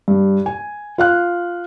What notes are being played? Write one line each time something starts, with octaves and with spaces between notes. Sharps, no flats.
G2
G#5
F4 F5 F#6